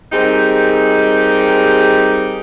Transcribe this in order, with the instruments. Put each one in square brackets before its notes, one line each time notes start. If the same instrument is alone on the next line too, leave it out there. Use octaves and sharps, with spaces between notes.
[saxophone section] G3 C4 D#4 G4 G#4 A#4